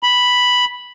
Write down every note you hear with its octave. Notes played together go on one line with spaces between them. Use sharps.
B5